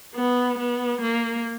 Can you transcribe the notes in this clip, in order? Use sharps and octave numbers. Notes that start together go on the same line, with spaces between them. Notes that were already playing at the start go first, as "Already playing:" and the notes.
B3
B3
A#3